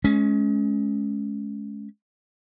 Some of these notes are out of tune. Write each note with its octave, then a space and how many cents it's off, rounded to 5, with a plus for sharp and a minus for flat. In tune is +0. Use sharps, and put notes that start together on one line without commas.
G#3 +30 C#4 +10